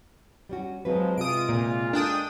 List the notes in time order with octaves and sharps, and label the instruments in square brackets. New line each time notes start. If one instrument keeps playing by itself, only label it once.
[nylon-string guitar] G3 C#4 F#4
[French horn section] F3 G#3 [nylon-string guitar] F#3 C4 B4
[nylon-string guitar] C3 [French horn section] G#3 F4 [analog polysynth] D#6 D7
[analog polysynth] A#2
[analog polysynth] D4 G5 D#6 [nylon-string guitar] A4 A#4